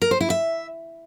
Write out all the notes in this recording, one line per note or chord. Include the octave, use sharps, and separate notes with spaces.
A#4
C5
E4
E5